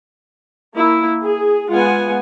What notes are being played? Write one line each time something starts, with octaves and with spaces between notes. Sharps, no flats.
A#3 E4
G#4
G#3 B3 F4 F#5 G#5